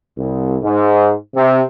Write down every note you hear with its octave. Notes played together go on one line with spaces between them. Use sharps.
C2
G#2
C3